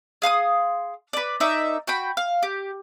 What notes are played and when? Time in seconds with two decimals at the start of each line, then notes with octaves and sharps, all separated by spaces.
0.22 G#4 F5 C6 D#6
1.13 B4 D5
1.40 D#4 A#4 D5 E5
1.87 F#4 G5 B5
2.17 F5
2.43 G4